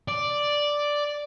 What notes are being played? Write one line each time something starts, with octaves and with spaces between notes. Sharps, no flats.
D5